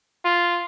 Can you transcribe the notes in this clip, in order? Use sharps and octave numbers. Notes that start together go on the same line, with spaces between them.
F4